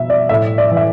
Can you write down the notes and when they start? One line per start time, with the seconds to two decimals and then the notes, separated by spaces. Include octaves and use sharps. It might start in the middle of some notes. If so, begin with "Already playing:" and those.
Already playing: B2 E5
0.10 D5
0.29 A2 E5
0.58 D5
0.71 E3
0.77 E5